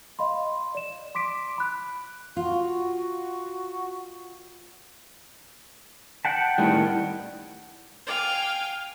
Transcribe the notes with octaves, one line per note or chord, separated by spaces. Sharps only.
D#5 F5 B5 C6
D5 E7
C6 D6 B6 D7
B5 F#6
F4 F#4
F#5 G5 A5
A2 D#3 G3
F5 G5 G#5